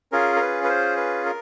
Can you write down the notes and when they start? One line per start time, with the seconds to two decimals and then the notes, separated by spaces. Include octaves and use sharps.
0.12 C#4 F4 G#4 A#4
0.36 A#4
0.41 B4
0.64 B4
0.69 C5
0.97 B4
1.26 A#4